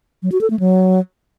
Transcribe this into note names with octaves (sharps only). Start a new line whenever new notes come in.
F#3
F#4
A4
A3
F#3